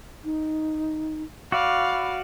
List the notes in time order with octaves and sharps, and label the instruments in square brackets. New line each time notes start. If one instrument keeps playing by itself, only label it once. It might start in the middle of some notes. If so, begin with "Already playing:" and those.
[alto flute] D#4
[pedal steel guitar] F#4 D5 [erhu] F5 [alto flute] B5